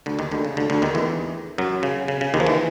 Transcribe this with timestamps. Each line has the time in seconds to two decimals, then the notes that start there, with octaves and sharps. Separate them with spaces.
0.06 D2 D3
0.19 D#2 D#3
0.31 D2 D3
0.45 C#3
0.57 D2 D3
0.70 D2 D3
0.82 D#2 D#3
0.95 E2 E3
1.58 F#2 F#3
1.83 C#3
2.08 C#3
2.21 C#3
2.34 D#2 D#3
2.40 F3
2.47 E3